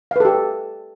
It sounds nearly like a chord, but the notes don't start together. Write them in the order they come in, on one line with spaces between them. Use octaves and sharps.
F5 B4 A4 G4